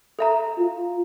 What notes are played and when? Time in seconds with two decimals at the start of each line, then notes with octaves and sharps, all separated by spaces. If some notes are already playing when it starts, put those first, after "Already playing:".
0.19 A4 E5 A#5
0.58 F4